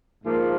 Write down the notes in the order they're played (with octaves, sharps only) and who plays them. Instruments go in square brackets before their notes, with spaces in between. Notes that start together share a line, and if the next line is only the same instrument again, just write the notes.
[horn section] G#2 F3 A#3